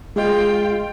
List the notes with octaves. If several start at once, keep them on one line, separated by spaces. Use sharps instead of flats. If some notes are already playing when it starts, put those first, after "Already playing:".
G#3 F4 G#4 D#5 G5